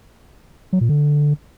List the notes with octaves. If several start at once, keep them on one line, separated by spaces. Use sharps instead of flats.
F#3
A#2
D3